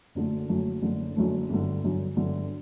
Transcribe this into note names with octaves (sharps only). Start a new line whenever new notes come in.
F#1 F#2 D3 F#3 A3
F#1 F#2 D3 F#3 A3
F#1 F#2 D3 F#3 A3
F#1 F#2 D3 F#3 A3
G1 F#2 D3
G1 F#2 D3
G1 F#2 D3